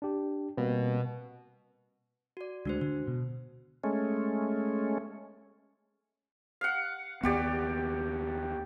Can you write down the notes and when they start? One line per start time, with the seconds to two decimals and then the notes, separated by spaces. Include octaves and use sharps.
0.02 D4 G4
0.57 B2 G3 A#3 C4
2.37 F#4 D5
2.65 D2 G#3 D4 F#4 C5
2.81 D3 F#4
3.07 B2
3.84 G#3 A3 C#4
6.61 F5 F#5
7.23 D#2 B3 F#4 G4 D5